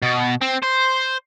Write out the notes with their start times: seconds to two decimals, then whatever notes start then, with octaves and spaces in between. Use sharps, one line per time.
0.02 B2
0.41 C4
0.62 C5